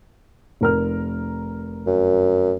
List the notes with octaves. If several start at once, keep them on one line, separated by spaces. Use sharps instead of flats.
F1 A#4 F6
F#2